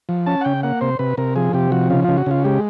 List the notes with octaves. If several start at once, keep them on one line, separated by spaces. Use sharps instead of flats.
F3
C#4 A5
F#5
C#3 G5
A#3 F#5
C3 C5
C3 B4
C3 A#4
F3 G#4
C3 G4
F3 F#4
C#3 F4
C#3 F4
F#4
C#3 F4
G#3 G4